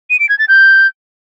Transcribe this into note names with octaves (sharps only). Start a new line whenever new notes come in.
D#7
D7
G#6
A6
G6